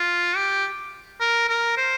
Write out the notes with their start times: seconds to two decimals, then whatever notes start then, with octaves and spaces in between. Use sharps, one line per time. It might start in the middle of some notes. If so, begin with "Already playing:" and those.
Already playing: F4
0.36 G4
1.21 A#4
1.49 A#4
1.77 C5